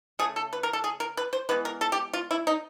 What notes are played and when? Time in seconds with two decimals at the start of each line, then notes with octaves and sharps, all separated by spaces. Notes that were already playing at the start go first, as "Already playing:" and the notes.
0.19 C#3 F3 A3 G#4
0.36 A4
0.53 B4
0.63 A#4
0.73 A4
0.84 G#4
1.00 A#4
1.17 B4
1.33 C5
1.49 E3 G#3 B3 B4
1.65 A#4
1.81 A4
1.92 G4
2.13 F4
2.31 E4
2.47 D#4